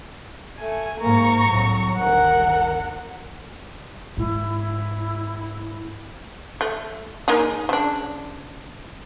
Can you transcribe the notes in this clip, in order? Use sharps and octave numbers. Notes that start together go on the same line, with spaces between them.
A3 G#5
G#2 A#3 A#5 C#6
C2 A2 F#3
G1 D2 D#3 A#4 F#5
G#2 E4
A3
A#3 D#4 G#4
C#3 D4